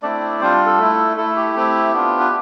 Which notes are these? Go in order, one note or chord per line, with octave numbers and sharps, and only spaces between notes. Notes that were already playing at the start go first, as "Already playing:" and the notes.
A3 C4 D4 E4 D5
G3 C4 D4 F4 C5
A4
A3 E4
A3 E4 A4
G4
A3 C4 E4
B3 D4 F4
B4